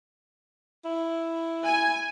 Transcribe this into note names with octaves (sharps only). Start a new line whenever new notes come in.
E4
G#5